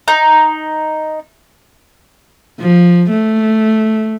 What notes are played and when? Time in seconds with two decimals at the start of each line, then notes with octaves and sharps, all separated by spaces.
0.08 D#4
2.60 F3
3.10 A3